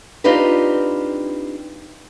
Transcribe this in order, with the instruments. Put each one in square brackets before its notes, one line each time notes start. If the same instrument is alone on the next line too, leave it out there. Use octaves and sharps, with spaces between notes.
[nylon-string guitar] C4 D4 D#4 F4 G4 B4